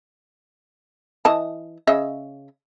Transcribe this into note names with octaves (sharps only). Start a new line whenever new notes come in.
E3 D#5 A5
C#3 D#5 E5